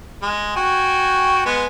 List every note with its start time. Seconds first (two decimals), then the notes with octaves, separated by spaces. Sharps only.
0.22 G#3
0.56 F#4 G5 G#5
1.46 G#3 B3